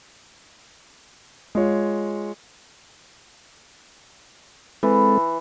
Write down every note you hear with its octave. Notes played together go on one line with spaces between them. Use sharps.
G#3 F4 C#5
E3 G#3 C4 A4